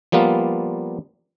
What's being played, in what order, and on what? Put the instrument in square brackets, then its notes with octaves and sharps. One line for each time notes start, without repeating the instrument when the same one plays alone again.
[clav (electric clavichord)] F3 G3 A#3 B3 F4